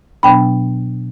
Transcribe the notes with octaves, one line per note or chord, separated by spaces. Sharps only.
B2 F#3 B3 D4 G5 B5